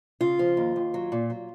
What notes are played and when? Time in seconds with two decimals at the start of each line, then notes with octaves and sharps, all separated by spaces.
0.21 C#3 F4
0.39 F3
0.57 D#2
0.76 D#2
0.94 F#3
1.12 A#2
1.30 F#3